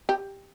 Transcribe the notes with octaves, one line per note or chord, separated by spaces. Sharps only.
G4